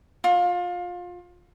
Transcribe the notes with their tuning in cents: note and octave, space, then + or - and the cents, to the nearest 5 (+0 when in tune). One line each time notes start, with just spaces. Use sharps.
F4 +25